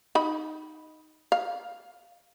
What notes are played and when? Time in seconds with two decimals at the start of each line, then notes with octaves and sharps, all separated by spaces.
0.15 D#4 B5
1.32 F5